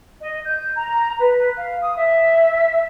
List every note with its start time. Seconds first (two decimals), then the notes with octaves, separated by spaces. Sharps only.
0.20 D#5
0.45 G6
0.76 A#5
1.20 B4
1.56 F5
1.82 D#6
1.96 E5